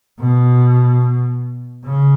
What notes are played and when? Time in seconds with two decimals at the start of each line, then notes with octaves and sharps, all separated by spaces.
0.19 B2
1.85 C#3